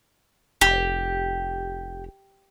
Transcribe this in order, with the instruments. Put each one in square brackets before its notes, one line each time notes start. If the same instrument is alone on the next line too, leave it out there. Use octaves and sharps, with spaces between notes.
[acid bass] F1 [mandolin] G4